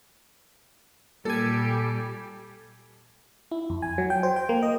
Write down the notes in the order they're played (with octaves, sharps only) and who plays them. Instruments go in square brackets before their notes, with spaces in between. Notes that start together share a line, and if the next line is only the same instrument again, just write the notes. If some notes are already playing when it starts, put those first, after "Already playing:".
[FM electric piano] A#2 G#5 [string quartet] G3 [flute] G4 [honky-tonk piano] A4
[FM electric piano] E4
F2
G#5
F#3
G5
C5
G5
A#3
D#5